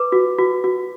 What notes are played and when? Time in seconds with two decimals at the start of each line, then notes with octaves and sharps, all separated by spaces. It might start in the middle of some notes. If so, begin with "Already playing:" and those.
Already playing: B4 D6
0.12 F#4
0.38 F#4
0.64 F#4